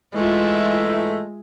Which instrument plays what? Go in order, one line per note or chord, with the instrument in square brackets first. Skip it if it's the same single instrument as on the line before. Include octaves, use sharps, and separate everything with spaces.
[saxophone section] G#2 E3 A3 [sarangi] G#3 [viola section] F4 E5